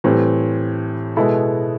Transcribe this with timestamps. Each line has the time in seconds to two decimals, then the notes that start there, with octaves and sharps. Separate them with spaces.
0.04 A2 E3 G3 C4
1.16 B2 G#3 B3 E4 A4